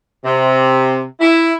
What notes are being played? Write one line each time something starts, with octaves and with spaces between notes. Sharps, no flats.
C3
E4